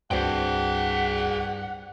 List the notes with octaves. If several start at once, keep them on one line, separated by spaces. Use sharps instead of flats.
C2 G2 C4 F#4 G#4 F#5 G5